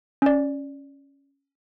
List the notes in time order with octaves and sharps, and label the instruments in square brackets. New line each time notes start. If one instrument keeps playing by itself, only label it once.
[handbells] C#4 D5